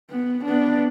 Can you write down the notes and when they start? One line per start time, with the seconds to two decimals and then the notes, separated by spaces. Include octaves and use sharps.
0.11 B3
0.45 B3 D4